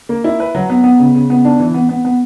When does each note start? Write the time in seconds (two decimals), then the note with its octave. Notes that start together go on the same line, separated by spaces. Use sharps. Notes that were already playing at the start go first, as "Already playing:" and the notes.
0.09 A#3
0.24 E4
0.40 B4
0.55 F#3
0.70 B3
0.84 B3
0.99 C#3
1.15 C#3
1.30 B3
1.45 D4
1.60 E3
1.74 B3
1.89 B3
2.05 B3